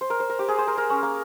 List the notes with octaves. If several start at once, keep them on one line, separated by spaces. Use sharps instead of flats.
C5
A#4
C5
A#4
G4
G#4
C5
A#4
A#4
C#4
A#3